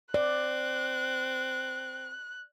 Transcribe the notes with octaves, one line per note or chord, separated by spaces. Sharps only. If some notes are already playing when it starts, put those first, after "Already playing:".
C4 D5 F#6